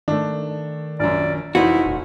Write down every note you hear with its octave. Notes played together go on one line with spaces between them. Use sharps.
D#3 A3 D4
A#1 F#2 D5
F1 E3 D#4 E4 F#4 C5
D#1